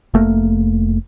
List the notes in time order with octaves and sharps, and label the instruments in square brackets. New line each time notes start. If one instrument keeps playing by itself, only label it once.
[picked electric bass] F1 A3 A#3